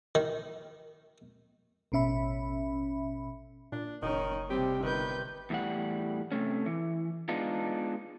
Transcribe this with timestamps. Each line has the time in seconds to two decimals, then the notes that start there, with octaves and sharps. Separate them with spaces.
0.15 D#3
1.92 A1 B2 C#4 E5 B5
3.72 A#2 D4
4.02 F#1 D#3 C#4 D#4
4.50 C3 G3 C4 G4
4.83 G1 D#3 B4 G6
5.50 E2 A2 G3 F#5
6.32 C3 A3 C#4
6.66 E3
7.29 G#3 B3 D4 D#4 F4